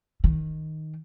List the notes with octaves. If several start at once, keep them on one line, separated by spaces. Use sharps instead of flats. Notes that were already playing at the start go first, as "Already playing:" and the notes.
D#3